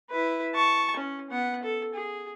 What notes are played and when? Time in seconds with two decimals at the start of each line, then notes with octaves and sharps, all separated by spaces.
0.11 E4 B4
0.55 A5 C#6
0.97 C#4
1.31 B3 F#5
1.63 A4
1.94 G#4